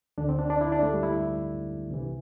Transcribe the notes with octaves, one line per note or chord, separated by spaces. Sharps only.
D2 D3 D4
C4
D4
D4
E4
D4
A3
G3
E4
C2 C3 E3